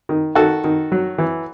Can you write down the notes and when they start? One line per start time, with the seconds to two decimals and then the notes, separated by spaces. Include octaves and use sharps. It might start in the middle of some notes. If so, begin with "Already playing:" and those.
0.09 D#3
0.35 D#3 F#4 A4
0.64 D#3
0.92 F#3
1.18 E3